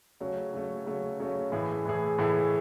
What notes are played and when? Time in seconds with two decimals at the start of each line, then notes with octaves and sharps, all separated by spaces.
0.20 C#3 F#3 A3 C#4
0.53 C#3 F#3 A3 C#4
0.86 C#3 F#3 A3 C#4
1.20 C#3 F#3 A3 C#4
1.52 A2 E3 A3 E4 G#4
1.86 A2 E3 A3 E4 G#4
2.18 A2 E3 A3 E4 G#4